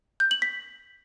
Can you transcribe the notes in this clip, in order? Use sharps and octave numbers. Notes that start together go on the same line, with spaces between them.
G6
F#7
B6